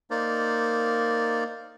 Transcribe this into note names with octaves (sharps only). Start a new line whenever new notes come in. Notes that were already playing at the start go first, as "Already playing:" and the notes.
A#3 D#4 A#4 C5 D5